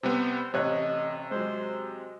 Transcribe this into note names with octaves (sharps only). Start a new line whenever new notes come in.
C3 G3 B3 C5
A1 C3 C#5 D#5 F#6
F#3 G#3 C5